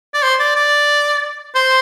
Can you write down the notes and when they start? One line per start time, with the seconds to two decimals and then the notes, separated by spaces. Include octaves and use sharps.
0.14 D5
0.23 C5
0.39 D5
0.56 D5
1.55 C5